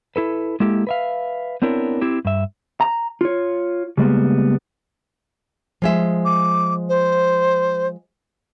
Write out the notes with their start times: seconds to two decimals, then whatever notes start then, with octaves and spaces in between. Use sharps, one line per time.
0.16 E4 A4 B4
0.60 G#3 A#3 E4 G4 A4
0.87 B4 E5 F5
1.62 B3 C4 D4 E4 A#4 C#5
2.01 C4 E4 G4
2.25 G2 E5
2.81 A#5
3.21 F4 C#5
3.97 C#3 G3 G#3 A#3 B3
5.82 F3 G#3 E5
6.25 D6
6.89 C5